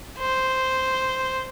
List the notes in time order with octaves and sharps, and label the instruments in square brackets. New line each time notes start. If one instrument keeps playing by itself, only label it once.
[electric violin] C5